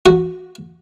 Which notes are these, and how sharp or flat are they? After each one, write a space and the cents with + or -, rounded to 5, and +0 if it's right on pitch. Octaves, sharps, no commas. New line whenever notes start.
F#4 -15